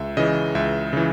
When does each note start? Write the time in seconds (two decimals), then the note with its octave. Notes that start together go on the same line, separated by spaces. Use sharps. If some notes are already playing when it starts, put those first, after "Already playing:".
Already playing: C#2 E5
0.17 C#3 E3 D#5
0.55 C#2 E5
0.93 C#3 E3